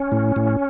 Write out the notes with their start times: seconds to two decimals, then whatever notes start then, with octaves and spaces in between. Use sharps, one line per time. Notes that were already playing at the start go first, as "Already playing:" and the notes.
Already playing: C#4
0.12 A2
0.36 A2